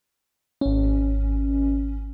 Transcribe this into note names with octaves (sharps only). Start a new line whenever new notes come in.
G#1 C#4